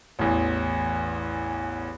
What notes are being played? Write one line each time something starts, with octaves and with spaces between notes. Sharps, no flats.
A1 E2